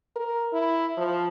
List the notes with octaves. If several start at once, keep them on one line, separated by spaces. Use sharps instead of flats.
A#4
E4
F3